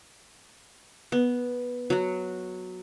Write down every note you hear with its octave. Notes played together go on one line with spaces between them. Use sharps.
B3
F#3 F#4